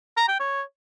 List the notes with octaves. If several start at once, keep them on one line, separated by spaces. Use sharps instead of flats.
A#5
G5
C#5